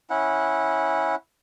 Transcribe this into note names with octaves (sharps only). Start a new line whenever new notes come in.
C#4 E4 F#5